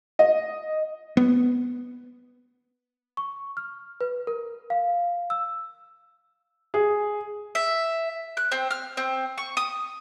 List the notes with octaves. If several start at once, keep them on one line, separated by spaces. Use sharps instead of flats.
D#5
B3
C#6
F6
B4
A#4
F5
E6
G#4
E5
F#6
C4
F6
C4
C#6
D#6